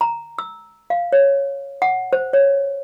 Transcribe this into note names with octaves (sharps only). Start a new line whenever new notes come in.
A#5
E6
F5
C#5
F#5
C5
C#5